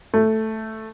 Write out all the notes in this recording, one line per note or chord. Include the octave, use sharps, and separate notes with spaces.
A3